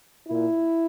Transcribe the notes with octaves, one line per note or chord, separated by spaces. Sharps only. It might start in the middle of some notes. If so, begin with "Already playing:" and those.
A#2 E4